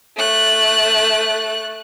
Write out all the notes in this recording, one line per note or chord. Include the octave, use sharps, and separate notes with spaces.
A3 F#6